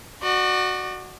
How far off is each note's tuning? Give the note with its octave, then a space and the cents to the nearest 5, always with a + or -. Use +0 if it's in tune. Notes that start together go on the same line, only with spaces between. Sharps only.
F#4 +0 D5 +35